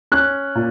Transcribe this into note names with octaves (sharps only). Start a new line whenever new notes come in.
C#4 F#6
A#2